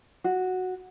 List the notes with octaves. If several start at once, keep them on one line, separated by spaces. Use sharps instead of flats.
F#4